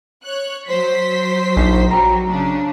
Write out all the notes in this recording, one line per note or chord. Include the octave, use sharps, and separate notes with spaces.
C#5 F#6
F#3 C5 B6
A#1 D#4
F#3 G3 A#5
C#3 D4